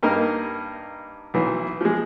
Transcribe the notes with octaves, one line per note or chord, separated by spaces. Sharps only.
G2 A#3 D#4 A#4 D#5
B1 E3
F3 G#3